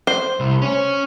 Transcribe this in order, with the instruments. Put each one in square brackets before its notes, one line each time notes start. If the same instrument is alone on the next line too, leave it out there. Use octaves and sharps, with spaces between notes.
[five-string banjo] C5
[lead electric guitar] C2
C#4 C#5